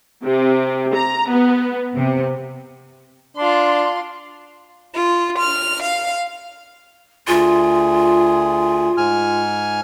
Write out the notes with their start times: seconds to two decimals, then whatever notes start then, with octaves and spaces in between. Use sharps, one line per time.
0.24 C3
0.94 A#5
1.29 B3
1.96 C3
3.37 D4 F4 C6
4.94 F4
5.38 F6
5.83 F5
7.28 D2 F4 G#4
8.97 G#2 G#5 F6